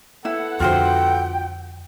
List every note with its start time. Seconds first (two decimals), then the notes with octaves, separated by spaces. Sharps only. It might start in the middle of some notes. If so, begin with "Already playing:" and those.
0.25 B3 E4 A4 F#5
0.60 F2 D3 F4 F#4 C5 G5